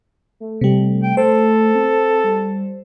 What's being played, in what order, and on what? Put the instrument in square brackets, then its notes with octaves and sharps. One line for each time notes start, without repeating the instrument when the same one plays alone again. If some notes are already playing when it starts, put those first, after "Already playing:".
[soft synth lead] A3
[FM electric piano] C3 G3
[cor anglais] G5
[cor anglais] A4 [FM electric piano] C5
[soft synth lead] C4
G3